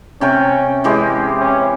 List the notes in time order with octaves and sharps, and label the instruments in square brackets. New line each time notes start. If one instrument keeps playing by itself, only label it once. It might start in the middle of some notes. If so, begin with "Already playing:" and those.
[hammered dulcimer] C3 G5 C#6 [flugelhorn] C#4
[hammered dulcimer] E3 G#3 G4 [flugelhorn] C#4
[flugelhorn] C#4